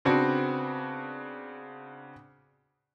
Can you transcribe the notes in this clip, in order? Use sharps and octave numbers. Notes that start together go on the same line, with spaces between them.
C#3 B3 C4 D4 F#4